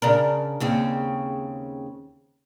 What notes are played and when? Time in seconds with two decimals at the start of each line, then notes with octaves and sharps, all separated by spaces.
0.02 C#3 D4 A#4
0.60 D#2 C#3 C4